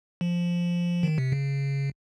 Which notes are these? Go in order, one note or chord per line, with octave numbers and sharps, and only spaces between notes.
F3
D#3
C3
C#3